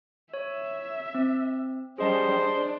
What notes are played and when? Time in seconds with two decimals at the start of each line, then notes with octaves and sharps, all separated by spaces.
0.34 C#5 E5
1.15 C4
1.98 G3 C#4 G#4 C5 D#5 A5
2.32 D4